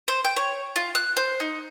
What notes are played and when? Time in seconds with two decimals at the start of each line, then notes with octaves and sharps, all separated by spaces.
0.08 C5
0.25 G5
0.36 C#5
0.76 F4
0.95 F#6
1.17 C5
1.40 D#4